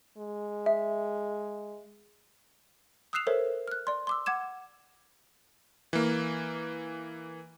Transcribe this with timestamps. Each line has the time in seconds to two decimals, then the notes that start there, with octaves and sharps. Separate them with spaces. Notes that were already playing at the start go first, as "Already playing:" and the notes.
0.18 G#3
0.66 E5
3.13 D#6 E6 F#6 C7 E7 F7
3.27 A4 A#4 C5 C#5 E5
3.68 F6 F#6
3.87 D5 C6
4.07 C6 D6 E6
4.26 F#5 D6 G#6 E7
5.93 E3 A#3